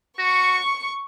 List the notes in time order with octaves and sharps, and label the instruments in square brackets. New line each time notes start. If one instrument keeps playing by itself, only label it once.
[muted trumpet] F#4 [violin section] C#6